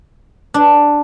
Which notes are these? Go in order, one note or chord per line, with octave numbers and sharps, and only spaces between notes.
D4